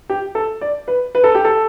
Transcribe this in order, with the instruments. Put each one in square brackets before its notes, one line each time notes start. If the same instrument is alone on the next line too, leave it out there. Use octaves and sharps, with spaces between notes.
[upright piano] G4
A4
D5
B4
B4
A4
G4
A4